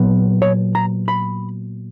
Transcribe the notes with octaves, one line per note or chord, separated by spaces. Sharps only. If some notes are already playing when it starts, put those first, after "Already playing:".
Already playing: A#2 F#3 B3
C#5
A#5
B5